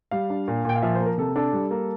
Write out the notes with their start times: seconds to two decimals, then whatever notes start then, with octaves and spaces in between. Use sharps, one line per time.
0.11 G3 F5
0.30 D4
0.48 A#2
0.65 A#2 G5
0.76 F5
0.82 F3 E5
0.95 C5
1.00 A#3
1.06 A#4
1.18 C3 A4
1.36 D4 A4
1.53 G3
1.71 A#3